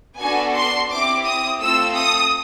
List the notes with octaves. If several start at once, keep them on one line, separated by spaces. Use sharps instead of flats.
B3 D4 F#4 A4 G#5
C6
C4 E4 G4 D6
D#6
A3 C4 F4 A4 E6
D#6